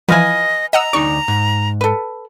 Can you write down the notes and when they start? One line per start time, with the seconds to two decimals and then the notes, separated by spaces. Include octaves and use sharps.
0.09 E3 F3 B4 D#5 F5 G#5
0.73 D#5 F#5 A#5 E6
0.93 D2 D#4 D5 C#6
1.28 G#2
1.81 A4 B4